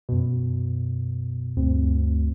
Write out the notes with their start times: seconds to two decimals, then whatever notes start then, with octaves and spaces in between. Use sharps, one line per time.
0.09 F#2 B2
1.57 D2 G2 C4